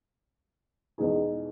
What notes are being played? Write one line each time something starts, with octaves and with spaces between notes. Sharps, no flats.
E2 B2 G#3 D#4 G#4